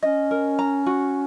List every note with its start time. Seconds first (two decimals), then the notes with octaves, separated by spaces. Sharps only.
0.02 C#4 D#5
0.31 A#4
0.59 A#5
0.86 F#4